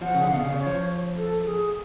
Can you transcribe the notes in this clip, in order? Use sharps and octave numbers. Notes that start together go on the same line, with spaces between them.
F3 F#5
C#3
D3
B2 F5
C#3
D5
C#5
F3
A4
G#4